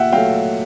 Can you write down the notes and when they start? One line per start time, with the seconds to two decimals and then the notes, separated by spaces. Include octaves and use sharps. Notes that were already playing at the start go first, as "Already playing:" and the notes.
Already playing: A#2 E5 F#5 G5
0.12 F#3 A3 F5 G5